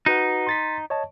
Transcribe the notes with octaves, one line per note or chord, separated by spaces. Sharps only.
D#4 F#4 B4 F#5
C6 A6 B6
C#5 D#5 A5